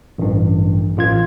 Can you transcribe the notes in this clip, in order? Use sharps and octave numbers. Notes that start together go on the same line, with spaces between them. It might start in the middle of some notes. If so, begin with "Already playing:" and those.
A1 G2
A1 F4 G#6